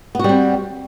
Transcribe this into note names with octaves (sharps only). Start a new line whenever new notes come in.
G3 B3 C4 F#4